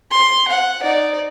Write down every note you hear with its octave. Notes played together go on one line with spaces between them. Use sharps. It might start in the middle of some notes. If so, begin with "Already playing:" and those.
C6
F#5
D#4 D5